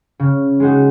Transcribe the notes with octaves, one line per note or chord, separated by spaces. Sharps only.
C#3
G#3 D#4 F#4